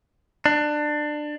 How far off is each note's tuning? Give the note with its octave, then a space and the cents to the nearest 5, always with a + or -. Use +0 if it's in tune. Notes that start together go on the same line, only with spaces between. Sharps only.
D4 +20